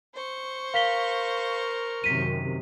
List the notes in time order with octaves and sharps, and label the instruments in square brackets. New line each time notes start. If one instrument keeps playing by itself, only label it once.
[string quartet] C5 C#6
[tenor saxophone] A#4 [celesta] F5 B6 G7
[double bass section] F#2 C3 D#3 [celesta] B6 D#7